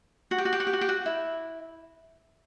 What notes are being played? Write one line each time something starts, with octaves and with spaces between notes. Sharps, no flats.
F#4
G4
F#4
G4
F#4
G4
F#4
G4
F#4
E4